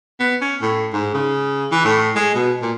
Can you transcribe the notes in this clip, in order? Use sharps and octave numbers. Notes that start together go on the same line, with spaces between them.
B3
C#4
A2
G#2
C#3
E3
A2
G#3
B2
A#2